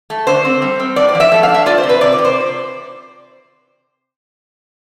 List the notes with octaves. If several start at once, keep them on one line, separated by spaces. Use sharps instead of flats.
A3
D3 C5
C4
G3
C4
A2 D5
D5
F3
E5
A3 E5
F5
D4
E5
F4 D5
C5
C3
B4
C3 D5
D5
C3
C5